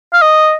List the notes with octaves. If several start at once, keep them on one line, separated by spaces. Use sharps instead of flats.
F5
D#5